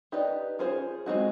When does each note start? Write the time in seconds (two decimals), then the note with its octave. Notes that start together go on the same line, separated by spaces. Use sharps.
0.12 D#4 G4 B4 D5
0.59 C#4 F4 G#4 C5
1.06 G#3 C4 D#4 F#4